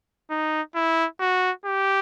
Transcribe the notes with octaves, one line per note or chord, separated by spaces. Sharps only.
D#4
E4
F#4
G4